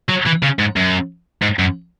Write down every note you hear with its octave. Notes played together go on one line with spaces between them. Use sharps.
F#3
E3
C#3
G#2
F#2
G#2
F#2